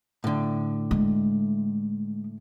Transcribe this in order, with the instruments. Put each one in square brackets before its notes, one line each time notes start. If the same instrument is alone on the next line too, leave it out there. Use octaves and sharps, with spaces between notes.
[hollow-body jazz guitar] A2 D3
[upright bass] G#3